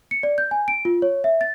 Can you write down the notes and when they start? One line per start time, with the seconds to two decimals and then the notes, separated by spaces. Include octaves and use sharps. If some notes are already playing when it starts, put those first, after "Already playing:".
0.11 C#7
0.23 D5
0.38 G6
0.51 G#5
0.68 D7
0.85 F4
1.02 C#5
1.24 E5
1.41 A6